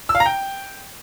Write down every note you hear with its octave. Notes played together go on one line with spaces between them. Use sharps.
E6
F5
A#5
G5